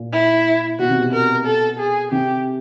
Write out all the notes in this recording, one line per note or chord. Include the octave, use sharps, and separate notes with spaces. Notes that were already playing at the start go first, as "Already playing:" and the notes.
Already playing: A#2
E4
B2 F#4
C3
B2
A#4
A4
G#4
C3 G4